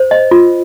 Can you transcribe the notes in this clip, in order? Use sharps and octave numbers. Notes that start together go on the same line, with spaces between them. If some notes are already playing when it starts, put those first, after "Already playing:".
Already playing: C5
D#5
F4